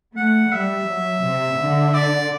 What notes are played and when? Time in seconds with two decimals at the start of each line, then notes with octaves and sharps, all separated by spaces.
0.17 A3 F#5
0.52 G3 E5
0.88 F#3
1.24 C3
1.59 D3
1.94 D5